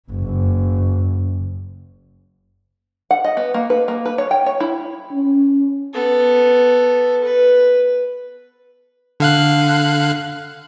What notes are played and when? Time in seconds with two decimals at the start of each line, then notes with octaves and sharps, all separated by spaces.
0.11 F#1
3.11 F#5
3.24 D#5
3.37 B3
3.54 A#3
3.70 B4
3.88 A#3
4.05 B4
4.18 C#5
4.31 G5
4.46 C#5
4.60 E4
5.12 C#4
5.94 B3 A4
7.24 B4
9.20 D3 F5 F#6